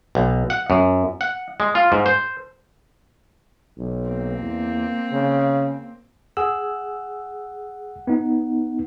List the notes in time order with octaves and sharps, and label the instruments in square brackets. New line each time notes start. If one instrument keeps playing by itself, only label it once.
[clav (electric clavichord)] B1
F#5
F#2
F#5
G#3
F4
G#2
C5
[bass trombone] B1
[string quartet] A#3 C4
[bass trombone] E2
C#3
[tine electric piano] G#4 E6 [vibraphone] F#5
[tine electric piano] B3 D#4